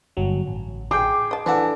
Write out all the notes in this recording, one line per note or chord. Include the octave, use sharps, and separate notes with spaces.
G1 F#3
A1
G#4 G5 D6
D#5 A5
E3 F3 D4 A4 D5 F#5